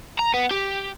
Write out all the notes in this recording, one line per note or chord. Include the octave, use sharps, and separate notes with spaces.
A#5
B3
G4